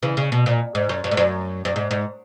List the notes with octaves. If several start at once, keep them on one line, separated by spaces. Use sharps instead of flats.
C#3 E3
C#3
B2
A#2
G#2
F#2
F#2
G#2
F#2
F#2
G#2
G#2